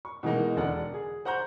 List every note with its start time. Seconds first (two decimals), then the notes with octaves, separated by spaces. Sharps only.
0.05 C#6
0.23 B2 E3 G#3 A#3 D#4
0.56 E1 D3 D4 D5 F#5
0.94 G#4
1.25 C5 F#5 A#5 C#6 G6